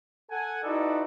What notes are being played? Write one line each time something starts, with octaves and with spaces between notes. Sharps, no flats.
A4 F#5 G#5
D#4 E4 F#4 A4 B4 D5